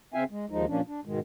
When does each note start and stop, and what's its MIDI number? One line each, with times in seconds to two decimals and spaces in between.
0.14 0.24 49
0.14 0.24 60
0.14 0.24 76
0.14 0.24 77
0.14 0.24 79
0.14 0.24 80
0.31 0.46 56
0.50 0.66 39
0.50 0.66 53
0.50 0.66 56
0.50 0.66 63
0.68 0.81 46
0.68 0.81 53
0.68 0.81 58
0.68 0.81 61
0.68 0.81 62
0.87 1.00 62
1.05 1.20 44
1.05 1.20 47
1.05 1.20 51
1.05 1.20 56